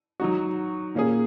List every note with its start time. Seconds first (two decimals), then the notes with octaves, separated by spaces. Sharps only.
0.20 F#3 D#4 F#4
0.95 A#2 A#3 C#4 G#4